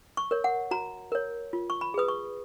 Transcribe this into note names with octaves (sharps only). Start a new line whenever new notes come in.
C#6
A#4 C#5
F#5
F#4 A#5
A#4 C#5
F4
C#6
B5
G#4 B4 D#6
C#6